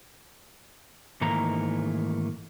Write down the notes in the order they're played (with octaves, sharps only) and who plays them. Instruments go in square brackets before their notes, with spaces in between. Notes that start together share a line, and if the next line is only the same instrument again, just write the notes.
[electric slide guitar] G#2 D#3 E3 A3 A#3 A#5